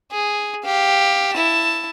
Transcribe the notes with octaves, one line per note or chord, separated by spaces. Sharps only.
G#4
G4 F5
E4 A5